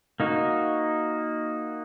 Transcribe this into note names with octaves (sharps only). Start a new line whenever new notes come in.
A#3 D#4 F#4